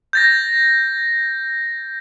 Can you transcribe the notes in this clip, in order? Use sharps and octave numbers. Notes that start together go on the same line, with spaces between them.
G6 A6 A#6